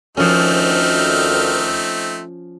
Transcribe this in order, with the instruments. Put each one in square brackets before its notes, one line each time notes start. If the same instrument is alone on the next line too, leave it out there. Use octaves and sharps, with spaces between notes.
[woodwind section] D2 D#3 F6 [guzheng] F3 C#4 [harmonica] A3 C4 D#4